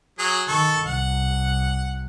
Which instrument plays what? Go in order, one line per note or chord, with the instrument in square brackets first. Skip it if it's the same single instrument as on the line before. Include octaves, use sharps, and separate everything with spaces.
[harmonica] F#3 G#4
[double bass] D#3 [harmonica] A4 C#6
[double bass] C2 [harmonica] F#5